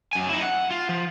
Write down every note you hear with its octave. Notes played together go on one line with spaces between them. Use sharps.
F#2 G#5
D#4 E4
F#5
F4
F3